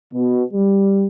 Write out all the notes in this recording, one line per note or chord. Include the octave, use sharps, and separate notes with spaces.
B2
G3